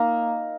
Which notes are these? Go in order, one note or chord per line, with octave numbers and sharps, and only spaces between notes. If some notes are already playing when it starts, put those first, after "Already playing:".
Already playing: A#3 D#4